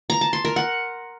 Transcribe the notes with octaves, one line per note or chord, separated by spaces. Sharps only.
A#5
A5
C6
A#4
F#5